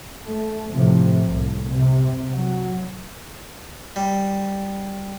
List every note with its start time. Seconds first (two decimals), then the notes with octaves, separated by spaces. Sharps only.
0.22 A3
0.70 A2 C3 F3
1.22 C2 A2
1.71 C3
2.32 F#3
3.96 G3